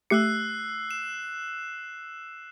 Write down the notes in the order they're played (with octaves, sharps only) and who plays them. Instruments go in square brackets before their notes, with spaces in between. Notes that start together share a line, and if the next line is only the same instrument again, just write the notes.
[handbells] A3 G4 C#7 [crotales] E6 F#6 C7
[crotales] E7